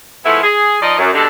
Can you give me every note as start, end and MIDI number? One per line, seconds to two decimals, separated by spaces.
0.25 0.40 53
0.25 0.40 56
0.25 0.40 57
0.25 0.40 59
0.25 0.40 64
0.43 0.77 68
0.82 0.95 53
0.82 0.95 63
0.82 0.95 74
0.82 0.95 75
0.98 1.10 42
1.14 1.27 47
1.14 1.27 50
1.14 1.27 55
1.14 1.27 56
1.14 1.27 62
1.14 1.27 69